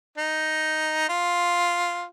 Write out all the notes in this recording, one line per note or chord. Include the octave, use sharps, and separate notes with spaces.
D#4
F4